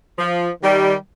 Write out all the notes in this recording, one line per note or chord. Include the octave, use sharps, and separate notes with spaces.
F3
D#3 G3